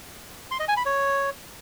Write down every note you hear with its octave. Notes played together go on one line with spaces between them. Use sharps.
C6
D#5
G#5
B5
C#5